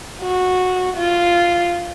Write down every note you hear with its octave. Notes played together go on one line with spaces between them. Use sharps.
F#4
F4